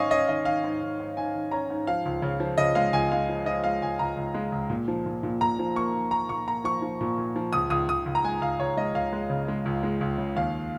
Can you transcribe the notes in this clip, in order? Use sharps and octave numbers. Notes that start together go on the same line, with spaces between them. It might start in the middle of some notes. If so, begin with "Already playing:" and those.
Already playing: G#2 D#3 C#4 D#5 F5 G#5 C#6
C#4 D#5
D#3 D#5
D#3 F5
G#2
D#3
G#2
G#2 G#5
D#3
C#4 A#5
G#2
F3 F5
C#2
C#3
F3
C#3 D#5
G#3 F5
C#2 G#5
G#3 F5
F3
F3 D#5
G#3 F5
C#2 G#5
C#2 A#5
C#2
G#3
C#2
A#2
F3
A#2
A#2
A#2 A#5
F3
A#3 C#6
F3
A#3 A#5
A#2 C#6
A#3 A#5
F3 C#6
F3
A#2
A#2
F3
C#2 D#6
C#2 D#6
C#2 D#6
C#2
A#5
G#3 G#5
C#2 F5
C#2 C#5
G#3 D#5
C#2 F5
G#3
C#3
G#3
C#2
G#3
C#2
C#3
D#2 F5